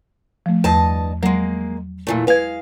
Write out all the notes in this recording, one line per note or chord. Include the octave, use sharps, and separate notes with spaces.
F3 A3
E2 G2 D#5 A5
F#3 G#3 A#3
A#2 E3 A3
G#3 B4 F5 G#6